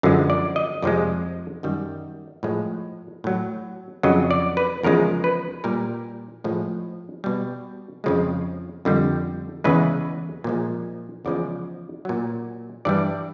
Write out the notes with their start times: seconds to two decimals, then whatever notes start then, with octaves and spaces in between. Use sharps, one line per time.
0.03 F#2 D3 F3 G#3
0.30 D5
0.56 D#5
0.82 F2 C3 F3 G#3 D5
1.63 F#2 D#3 G3
2.43 A2 F3 G#3
3.24 A2 F#3
4.03 F2 C#3 F#3 D#5
4.31 D5
4.57 B4
4.83 E2 C#3 F3 G#3 A#4
5.24 B4
5.64 A#2 G3 A#4
6.44 A2 F3 G#3
7.24 B2 G3
8.04 F2 C#3 F3 G#3
8.85 F2 D3 G3
9.64 E2 C#3 E3 G#3 B4
10.44 A#2 F3 G#3
11.25 E2 C#3 F3 G#3 D5
12.05 A#2 F#3
12.85 G2 E3 G3 D5